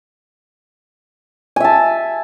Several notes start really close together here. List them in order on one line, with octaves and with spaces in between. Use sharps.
G#5 E5 A5